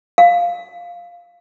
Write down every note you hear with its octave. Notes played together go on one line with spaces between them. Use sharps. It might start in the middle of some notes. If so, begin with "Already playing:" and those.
F5